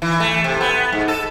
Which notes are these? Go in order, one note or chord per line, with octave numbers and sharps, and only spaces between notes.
E3
A3
C3
B3
G#2
A4